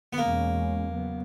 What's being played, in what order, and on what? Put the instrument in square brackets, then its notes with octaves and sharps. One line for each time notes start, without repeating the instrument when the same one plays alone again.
[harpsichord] B3
[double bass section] E2 B2 G#3 C#4 [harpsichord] A#3
[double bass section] C#3 F#3 B3